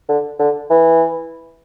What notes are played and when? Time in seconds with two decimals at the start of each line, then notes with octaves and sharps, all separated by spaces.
0.09 D3
0.39 D3
0.70 E3